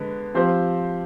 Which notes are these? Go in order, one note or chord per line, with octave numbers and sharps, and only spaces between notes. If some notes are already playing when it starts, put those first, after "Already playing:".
Already playing: D3 G#3 B3
F3 C4 G4 C5